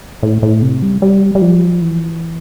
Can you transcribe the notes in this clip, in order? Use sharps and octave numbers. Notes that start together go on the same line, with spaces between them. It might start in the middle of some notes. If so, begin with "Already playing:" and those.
A2
A2
C3
G3
G3
G3
F3
E3